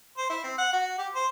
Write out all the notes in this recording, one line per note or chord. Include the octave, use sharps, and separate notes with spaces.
C5
E4
C4
F#5
F#4
G4
C5